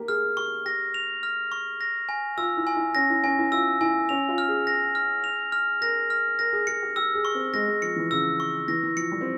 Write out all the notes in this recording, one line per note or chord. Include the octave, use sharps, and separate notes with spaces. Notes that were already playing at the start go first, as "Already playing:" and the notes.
Already playing: A#3 G4 A#4
G#4 F6
G4 C#6
G4 A#6
F7
F6
C#6
A#6
G#5
F4 E6
E4
G#5
E4
C#4 A#6
E4
C#4 G#5
E4
F4 E6
E4 G#5
C#4 F7
F4
F6
G#4
A#6
F6
F7
F6
A#4 A#6
F6
A#4 A#6
G#4
G#4 C#7
G4
G4 E6
G#4
C#6
C4
G#3 A#6
G#3
F3 C#7
E3
C#3 E6
C#6
E3 A#6
E3
F3 C#7
G3
C4